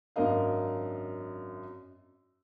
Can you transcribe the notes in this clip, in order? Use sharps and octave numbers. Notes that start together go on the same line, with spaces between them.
G#1 F#2 D4 A#4 D#5 F5